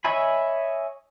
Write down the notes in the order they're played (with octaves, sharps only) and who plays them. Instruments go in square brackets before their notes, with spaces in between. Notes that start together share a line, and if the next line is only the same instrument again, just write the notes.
[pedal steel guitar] C#5 D#5 E5 G#5 B5